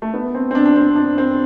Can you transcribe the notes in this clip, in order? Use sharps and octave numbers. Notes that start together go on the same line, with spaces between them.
A3
B3
C4
C4
D4
D4
C4
D4
C4